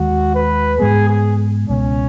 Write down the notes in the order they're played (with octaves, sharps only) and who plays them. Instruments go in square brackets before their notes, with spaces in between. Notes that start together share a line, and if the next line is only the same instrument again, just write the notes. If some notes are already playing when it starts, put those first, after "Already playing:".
Already playing: [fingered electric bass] D#2 D#3 G#3 [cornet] F#4
[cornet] B4
[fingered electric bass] G#2 G#3 B3 [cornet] G#4
[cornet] G#4
[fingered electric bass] C#2 B2 G#3 B3 [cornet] C#4